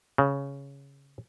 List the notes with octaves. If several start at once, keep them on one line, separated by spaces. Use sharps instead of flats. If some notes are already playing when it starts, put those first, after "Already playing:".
C#3